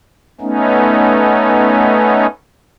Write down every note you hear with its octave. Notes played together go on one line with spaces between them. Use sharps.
A3 B3 C#4 D#4